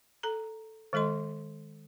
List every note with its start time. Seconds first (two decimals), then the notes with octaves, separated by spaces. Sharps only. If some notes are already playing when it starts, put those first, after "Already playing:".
0.23 A4 A#5
0.93 D#3 G#3 A4 D#5 C6